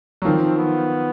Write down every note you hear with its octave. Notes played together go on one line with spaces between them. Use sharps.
F#3
D#3 F3 C4
B3